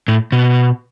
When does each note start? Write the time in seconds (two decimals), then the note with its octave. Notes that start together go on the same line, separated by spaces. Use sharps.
0.08 A2
0.32 B2